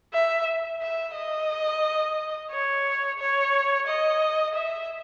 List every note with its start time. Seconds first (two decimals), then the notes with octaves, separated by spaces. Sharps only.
0.13 E5
0.81 E5
1.15 D#5
2.51 C#5
3.19 C#5
3.87 D#5
4.55 E5